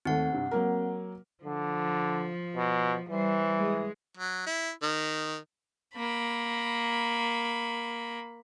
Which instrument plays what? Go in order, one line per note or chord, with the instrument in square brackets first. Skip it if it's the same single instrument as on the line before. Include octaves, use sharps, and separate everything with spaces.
[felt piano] D#2 A3 [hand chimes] C4 F#5
[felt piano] G2 C3
F#3 A#3 A#4
[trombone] D3 [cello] F3
[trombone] B2
[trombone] E3 [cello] G3 C5
[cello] G#3
[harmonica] F#3
E4
D#3
[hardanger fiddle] A#3 B5